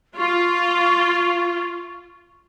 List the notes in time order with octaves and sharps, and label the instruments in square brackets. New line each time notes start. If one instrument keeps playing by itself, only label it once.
[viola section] F4 [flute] C#6